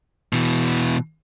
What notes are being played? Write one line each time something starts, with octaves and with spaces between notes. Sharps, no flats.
B2 E3